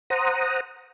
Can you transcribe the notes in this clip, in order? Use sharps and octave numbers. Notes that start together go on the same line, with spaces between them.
C5 F#5 A#5 D#6